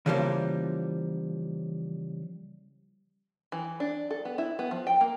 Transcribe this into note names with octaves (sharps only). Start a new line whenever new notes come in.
C#3 E3 F3 G3 G#3 A#3
E3
D4
A4
B3
E4
B3
F3
G5
A#3